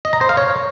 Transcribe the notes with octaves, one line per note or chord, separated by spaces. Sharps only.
D#5
A#5
C5
F5
C#5